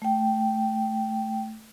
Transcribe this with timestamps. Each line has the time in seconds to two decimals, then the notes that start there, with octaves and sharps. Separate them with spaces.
0.02 A3 G5